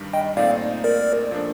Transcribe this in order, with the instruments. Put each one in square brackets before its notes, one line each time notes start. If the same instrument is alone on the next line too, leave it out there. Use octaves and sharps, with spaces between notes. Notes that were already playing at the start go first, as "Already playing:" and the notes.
Already playing: [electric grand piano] G2 D#3 G3 D4
[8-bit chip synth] D#5 G5
[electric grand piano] A#2 A3 C4 D#4 [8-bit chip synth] D5 F5
[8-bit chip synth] A#4 D5
[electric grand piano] A#2 F3 A3 D4